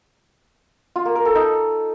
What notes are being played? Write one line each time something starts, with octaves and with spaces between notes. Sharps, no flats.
F4
A#3
A#4
A4
D#4